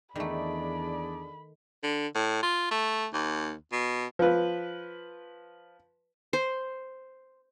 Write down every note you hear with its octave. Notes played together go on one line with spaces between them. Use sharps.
E2 D#3 A3 D4 G#4 D5 B5
D3
A2
F4
A3
D#2
B2
F3 B4
C5